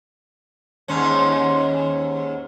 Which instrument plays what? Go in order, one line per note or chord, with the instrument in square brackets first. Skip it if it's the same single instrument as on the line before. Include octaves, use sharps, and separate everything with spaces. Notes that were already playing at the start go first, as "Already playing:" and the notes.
[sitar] D#2 G#2 C#4